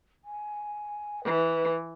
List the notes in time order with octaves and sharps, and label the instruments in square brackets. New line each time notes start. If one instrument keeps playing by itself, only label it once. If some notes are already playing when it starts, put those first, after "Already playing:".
[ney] G#5
[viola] E3 [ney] B4